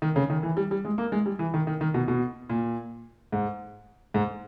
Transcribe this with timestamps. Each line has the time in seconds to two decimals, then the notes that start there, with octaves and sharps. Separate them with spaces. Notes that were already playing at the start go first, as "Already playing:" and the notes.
0.02 D#3
0.16 C#3
0.30 D#3
0.43 E3
0.57 G3
0.71 G3
0.85 G#3
0.98 A#3
1.12 G#3
1.26 G3
1.39 E3
1.54 D#3
1.67 D#3
1.81 D#3
1.94 B2
2.08 B2
2.49 A#2
3.32 G#2
4.14 G#2